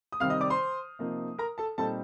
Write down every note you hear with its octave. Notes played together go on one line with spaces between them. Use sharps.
D#6
C3 D#3 G3 C4 F5 F6
D#5 D#6
D5 D6
C5 C6
C3 F3 A#3 D#4
A#4 A#5
A4 A5
A#2 G3 C4 D#4 A4 A5